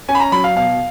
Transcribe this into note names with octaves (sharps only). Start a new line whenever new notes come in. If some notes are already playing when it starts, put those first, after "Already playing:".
C#4 G#5
B5
A#5
F#3 B5
F5
B2 F5